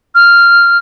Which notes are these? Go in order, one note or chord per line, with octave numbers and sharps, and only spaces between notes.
F6